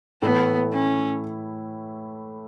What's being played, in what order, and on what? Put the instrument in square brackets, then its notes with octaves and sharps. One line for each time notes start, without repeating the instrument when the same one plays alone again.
[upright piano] A2 E3 A3 E4 [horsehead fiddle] B3
[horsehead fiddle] C#4